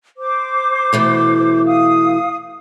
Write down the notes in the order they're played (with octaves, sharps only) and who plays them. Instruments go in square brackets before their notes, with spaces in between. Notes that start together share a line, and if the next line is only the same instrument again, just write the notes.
[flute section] C5 D6
[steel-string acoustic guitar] B2 E3 A3
[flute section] F5 D#6